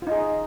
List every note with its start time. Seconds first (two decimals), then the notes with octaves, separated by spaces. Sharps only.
0.02 F4
0.07 D#4
0.11 G#4